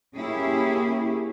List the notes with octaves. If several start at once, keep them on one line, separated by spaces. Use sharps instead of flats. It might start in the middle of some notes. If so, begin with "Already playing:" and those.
A#3 C#4 E4 G4 G#4